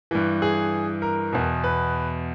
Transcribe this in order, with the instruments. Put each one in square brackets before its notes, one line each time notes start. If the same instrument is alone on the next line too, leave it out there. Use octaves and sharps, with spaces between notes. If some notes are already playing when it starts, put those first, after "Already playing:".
[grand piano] G2 E3
G#4
A#4
E2 B2
B4